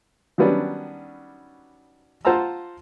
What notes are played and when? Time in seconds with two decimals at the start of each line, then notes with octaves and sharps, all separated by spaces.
0.38 D#3 F#3 G3 B3 C#4 D4
2.25 F4 C5 F#5 A5 A#5 E6